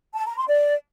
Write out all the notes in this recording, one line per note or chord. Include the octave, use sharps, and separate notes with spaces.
A5
A#5
C6
D5